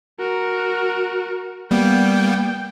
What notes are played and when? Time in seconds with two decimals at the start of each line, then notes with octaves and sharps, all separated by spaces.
0.19 F#4 A#4
1.71 G3 A#3 B3 G5